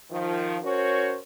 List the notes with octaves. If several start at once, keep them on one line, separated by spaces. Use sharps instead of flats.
D#3 F3
C#4 F#4 A#4 C5 C#5